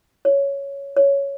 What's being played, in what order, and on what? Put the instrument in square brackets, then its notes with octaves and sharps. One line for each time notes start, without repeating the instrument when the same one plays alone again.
[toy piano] C#5
C#5